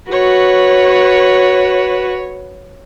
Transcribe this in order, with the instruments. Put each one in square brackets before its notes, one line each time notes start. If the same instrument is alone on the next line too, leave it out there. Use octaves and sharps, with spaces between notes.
[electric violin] F#4 B4 [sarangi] C#5